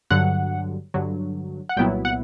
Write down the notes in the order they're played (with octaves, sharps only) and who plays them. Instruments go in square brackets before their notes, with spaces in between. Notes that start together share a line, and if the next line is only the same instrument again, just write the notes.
[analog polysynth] G2 D3 F#3 F#5
G2 D3 F#3
F#5
C2 A#2 F#3 B3 E4 G5
F#5